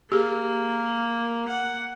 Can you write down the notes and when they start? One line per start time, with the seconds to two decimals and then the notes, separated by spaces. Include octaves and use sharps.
0.12 A#3 G4 G#4
1.49 F#5